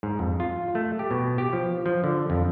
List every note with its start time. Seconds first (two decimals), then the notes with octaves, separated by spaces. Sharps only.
0.03 G#2
0.19 F2
0.40 F4
0.75 A3
0.99 G4
1.11 B2
1.38 G4
1.53 F3
1.86 F3
2.04 D3
2.30 F2